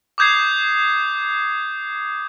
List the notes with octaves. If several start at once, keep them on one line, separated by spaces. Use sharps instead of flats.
D6 D#6 G6 G#6 C7